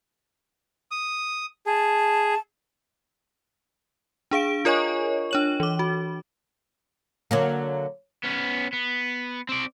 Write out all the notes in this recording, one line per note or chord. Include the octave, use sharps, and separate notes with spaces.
D#6
G#4 A5
D4 G#4 F5 D7
F4 A#4 C#5 D#5 G#5 C#6
D4 C#5 F#7
E3 D6
F#4
D3 F#3 A#3
B3 C#4
B3
C4 D5